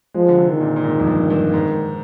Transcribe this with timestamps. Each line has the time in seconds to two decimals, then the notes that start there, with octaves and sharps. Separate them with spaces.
0.14 F3 G#3
0.29 D3
0.38 C3
0.49 D#3
0.61 A#2
0.76 A#2
0.84 G#2
1.00 F2
1.07 G2
1.30 G2
1.54 G#2